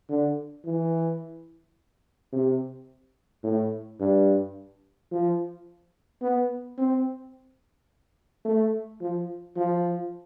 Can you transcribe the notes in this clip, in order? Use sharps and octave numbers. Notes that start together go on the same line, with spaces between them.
D3
E3
C3
A2
G2
F3
B3
C4
A3
F3
F3